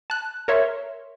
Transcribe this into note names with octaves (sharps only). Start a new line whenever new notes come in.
A5 F#6
A#4 C#5 E5 C6